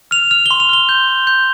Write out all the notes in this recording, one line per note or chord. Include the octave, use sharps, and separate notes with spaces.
F6 F7
F6 F7
G7
C6
F7
F6 G7
G6
C6
G6